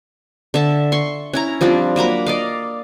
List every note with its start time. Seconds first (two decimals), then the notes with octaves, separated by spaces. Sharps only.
0.54 D3 E5 A5
0.92 C6 C#6
1.33 C#4 E4 A#5
1.61 F3 G3 C4 D4
1.96 F#3 A#3 A#5 B5
2.26 D5 D#5 F5